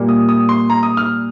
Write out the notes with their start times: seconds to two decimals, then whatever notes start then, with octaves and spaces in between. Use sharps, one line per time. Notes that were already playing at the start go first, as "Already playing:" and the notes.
Already playing: A#2 G3 A#3
0.09 D#6
0.29 D#6
0.49 C6
0.70 A#5
0.83 D#6
0.97 F6